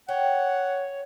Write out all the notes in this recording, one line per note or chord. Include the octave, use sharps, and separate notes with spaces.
C#5 F#5 G5